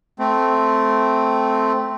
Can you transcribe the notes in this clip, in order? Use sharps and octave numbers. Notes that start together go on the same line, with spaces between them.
A3 C4